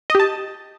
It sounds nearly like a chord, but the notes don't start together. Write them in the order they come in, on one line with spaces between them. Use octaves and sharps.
D#5 G4 A5